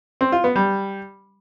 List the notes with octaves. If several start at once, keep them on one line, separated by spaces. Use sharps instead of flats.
C4
F4
B3
G3